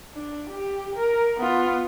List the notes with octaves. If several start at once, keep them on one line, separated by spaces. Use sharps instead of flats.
D4
G4
A#4
B3 F4